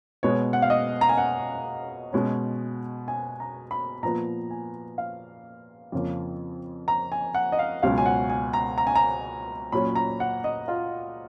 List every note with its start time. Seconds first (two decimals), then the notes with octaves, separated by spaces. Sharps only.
0.23 B2 G#3 B3 C#5
0.53 F#5
0.62 F5
0.70 D#5
1.01 A#5
1.09 G#5
1.18 F#5
2.13 B2 G#3 C#4
3.08 G#5
3.40 A#5
3.71 B5
4.03 A#2 F3 B3 A#5
4.50 G#5
4.98 F5
5.92 F2 C#3 F3 A#3
6.88 A#5
7.12 G#5
7.34 F#5
7.52 D#5
7.59 F5
7.83 C#2 B2 F#3 C#4 F5
7.98 G#5
8.06 F#5
8.30 G#5
8.53 A#5
8.78 A#5
8.87 G#5
8.95 A#5
9.72 A#2 F#3 C#4 B5
9.96 A#5
10.20 F#5
10.44 D#5
10.68 F4